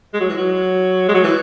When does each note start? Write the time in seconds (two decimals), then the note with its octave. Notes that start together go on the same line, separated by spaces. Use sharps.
0.14 G#3
0.21 F#3
0.29 E3
0.37 F#3
1.09 G#3
1.14 F#3
1.24 E3